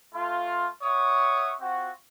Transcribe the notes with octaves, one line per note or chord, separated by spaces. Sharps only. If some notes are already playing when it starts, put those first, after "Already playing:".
A3 F4
C#5 E5 F#5 C#6 D#6
C4 F4 F#4